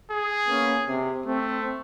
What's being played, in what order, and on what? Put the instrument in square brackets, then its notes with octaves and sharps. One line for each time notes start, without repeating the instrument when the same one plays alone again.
[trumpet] G#4
[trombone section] A#3 B3 C#4
C3
[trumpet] A3 [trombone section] C4